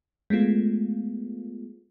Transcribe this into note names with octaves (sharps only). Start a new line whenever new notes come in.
G#3 A3 B3 F4